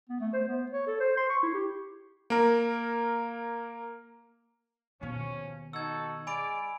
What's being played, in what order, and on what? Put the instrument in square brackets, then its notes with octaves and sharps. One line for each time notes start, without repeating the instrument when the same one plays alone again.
[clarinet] B3
A3
C5
B3
C#5
A4
C5
C6
C#6
E4
G4
[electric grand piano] A#3 A#4
[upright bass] D#2 B2 [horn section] F3 C#4
[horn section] D#4 F#4 A4 [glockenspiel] E6 G#6
[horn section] G#3 D5 [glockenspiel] G#5 B5 D7